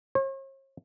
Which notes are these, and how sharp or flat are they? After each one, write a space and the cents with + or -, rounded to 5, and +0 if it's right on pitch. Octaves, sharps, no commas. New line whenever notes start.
C#5 -45